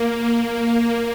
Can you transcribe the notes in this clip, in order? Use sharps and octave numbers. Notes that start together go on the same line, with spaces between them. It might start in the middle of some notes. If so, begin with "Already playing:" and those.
Already playing: A#3
A#3